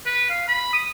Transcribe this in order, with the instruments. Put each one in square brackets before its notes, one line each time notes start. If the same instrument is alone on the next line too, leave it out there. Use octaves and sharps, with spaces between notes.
[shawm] B4
F5
B5
D#6